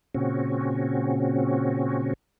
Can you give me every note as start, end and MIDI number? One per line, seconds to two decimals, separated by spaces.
0.14 2.13 46
0.14 2.13 49
0.14 2.13 60
0.14 2.13 61
0.14 2.13 66